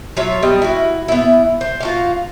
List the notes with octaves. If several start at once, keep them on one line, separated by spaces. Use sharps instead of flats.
F#3 F4 C#5 E5
G3 B3 D#5
E4 F#4
B3 E4
C5
F4 F#4 F5